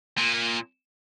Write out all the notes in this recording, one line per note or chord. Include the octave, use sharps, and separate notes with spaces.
A#2